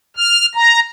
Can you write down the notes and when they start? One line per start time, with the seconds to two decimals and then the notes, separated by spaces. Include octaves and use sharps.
0.17 F6
0.55 A#5